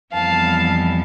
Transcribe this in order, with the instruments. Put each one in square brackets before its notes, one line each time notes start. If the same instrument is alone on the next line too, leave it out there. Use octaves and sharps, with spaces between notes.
[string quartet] F2 E3 G3 B3 F5 A5